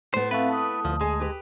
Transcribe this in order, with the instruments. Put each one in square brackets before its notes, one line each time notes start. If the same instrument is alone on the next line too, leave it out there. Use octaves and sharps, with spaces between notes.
[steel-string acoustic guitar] A2 B3 [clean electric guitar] C5
[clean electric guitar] A3 B4 [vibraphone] C4 E5 F5
[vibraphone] A5 D#6
[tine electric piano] D2 [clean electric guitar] F3
[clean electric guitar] G#3 [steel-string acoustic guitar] G#4
[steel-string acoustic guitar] G4 B4